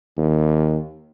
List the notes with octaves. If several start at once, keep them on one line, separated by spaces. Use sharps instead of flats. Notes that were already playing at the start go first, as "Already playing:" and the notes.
D#2